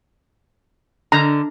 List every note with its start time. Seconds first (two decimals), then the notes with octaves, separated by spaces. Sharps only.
1.12 D3 A#5